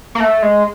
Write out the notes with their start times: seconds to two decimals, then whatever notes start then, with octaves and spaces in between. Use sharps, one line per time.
0.15 A#3
0.20 A3
0.42 G#3